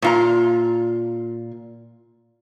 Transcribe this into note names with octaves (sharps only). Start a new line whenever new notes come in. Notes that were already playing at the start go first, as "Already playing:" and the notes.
A#2 F4 A#5